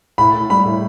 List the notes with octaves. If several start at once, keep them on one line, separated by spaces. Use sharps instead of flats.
A2 B5
A2
G3 B5
A2